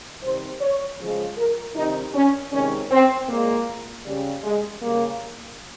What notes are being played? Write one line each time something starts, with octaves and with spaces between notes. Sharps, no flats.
C3 D#3 G3 C5
C#5
C#3 F3 G#3
A#4
C3 D#3 G3 D#4
C#4
C3 D#3 G#3 C#4
C4
A#2 G#3 A#3
C#3 G3
G#3
C#3 G3 A#3